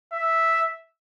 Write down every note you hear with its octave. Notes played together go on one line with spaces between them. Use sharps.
E5